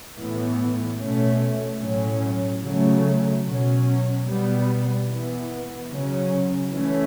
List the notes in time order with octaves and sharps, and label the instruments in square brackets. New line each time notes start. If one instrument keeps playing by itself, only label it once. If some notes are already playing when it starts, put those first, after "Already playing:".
[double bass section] A2 E3 B3
B2 A3 C#4
A2 F#3 C#4
C#3 F#3 A3 C#4
B2 F#3 C#4
B2 G3 B3
E3 B3
C#3 F#3 C#4
E3 A3 C#4